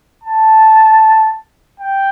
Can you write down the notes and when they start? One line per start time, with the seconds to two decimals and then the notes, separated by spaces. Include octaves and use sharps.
0.24 A5
1.80 G5